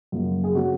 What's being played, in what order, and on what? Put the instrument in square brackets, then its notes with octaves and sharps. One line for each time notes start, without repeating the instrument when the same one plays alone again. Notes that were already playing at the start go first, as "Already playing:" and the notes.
[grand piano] F#2 C#3 F3 A#3
G#4
C#3 F#3 C#4 F#4